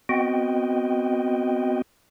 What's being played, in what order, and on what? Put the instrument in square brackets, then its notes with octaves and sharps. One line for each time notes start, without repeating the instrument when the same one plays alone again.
[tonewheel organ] B3 C4 F#4 D#5 G5